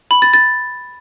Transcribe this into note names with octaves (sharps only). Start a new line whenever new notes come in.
B5
A6
A6